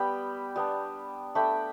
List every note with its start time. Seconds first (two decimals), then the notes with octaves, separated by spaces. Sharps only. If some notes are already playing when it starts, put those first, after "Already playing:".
Already playing: G3 B3 G5 B5
0.56 G3 B3 D4
1.35 A3 D4 G5 B5